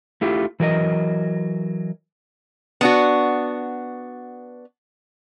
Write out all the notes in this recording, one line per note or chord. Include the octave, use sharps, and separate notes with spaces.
A3 E4 F4 G4
E3 F#3 A#4 D5 D#5
B3 D4 F#4